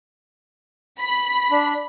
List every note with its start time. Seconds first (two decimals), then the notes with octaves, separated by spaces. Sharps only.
0.99 B5
1.51 D4